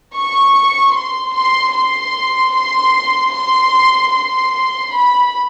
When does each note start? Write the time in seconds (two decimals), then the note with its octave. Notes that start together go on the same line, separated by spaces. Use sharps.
0.15 C#6
0.94 C6
1.35 C6
1.74 C6
2.54 C6
3.33 C6
4.13 C6
4.94 B5